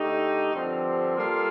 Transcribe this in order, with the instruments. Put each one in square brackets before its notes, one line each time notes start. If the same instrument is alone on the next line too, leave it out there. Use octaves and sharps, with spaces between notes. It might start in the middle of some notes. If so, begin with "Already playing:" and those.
Already playing: [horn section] D3 A3 D#4 G4
G2 D3 F3 C4 G4
G3 A#3 F4 A4